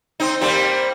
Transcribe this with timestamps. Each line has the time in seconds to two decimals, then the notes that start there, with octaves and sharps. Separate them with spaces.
0.20 C4 D#4
0.41 G3 A#3 C4